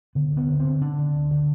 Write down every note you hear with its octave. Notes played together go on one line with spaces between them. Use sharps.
D3 B3
D2 B3
D3
C4
D3
D3 D4
D3
D2
D3